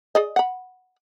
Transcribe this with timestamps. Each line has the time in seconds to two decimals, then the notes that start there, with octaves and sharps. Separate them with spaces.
0.15 G#4 D5 D#5
0.36 F#5 B5